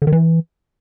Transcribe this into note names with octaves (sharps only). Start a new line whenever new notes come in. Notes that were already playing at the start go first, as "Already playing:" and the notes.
D3
D#3
E3